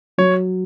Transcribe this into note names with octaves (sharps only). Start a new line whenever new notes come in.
F#3 C#5